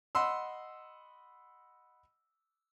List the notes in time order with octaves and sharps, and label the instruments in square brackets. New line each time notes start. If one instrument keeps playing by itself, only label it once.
[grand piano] D#5 F#5 B5 C6 E6